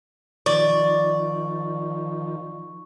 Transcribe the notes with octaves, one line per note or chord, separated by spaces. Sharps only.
D#3 F3 D5 C#6